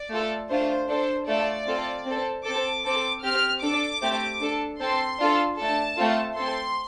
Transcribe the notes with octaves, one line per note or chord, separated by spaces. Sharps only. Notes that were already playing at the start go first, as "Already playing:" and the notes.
Already playing: D5
A3 F4 A4
A3 D4 F4 C5
D4 A4 C5
A3 F4 A4 D5
C4 F4 A4
C4 A4
C4 A4 D6
C4 A4 D6
C4 G4 F6
D4 A4 D6
A3 C4 G4
D4 A4
C4 A4 C6
D4 F4 A4
A3 D4 A4 A5
A3 C4 F4 A4
C4 A4 C6